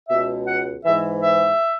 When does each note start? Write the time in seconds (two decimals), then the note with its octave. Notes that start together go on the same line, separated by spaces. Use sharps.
0.09 C#2 B2 E5
0.47 F#5
0.85 G#2 E3 E5
1.23 E5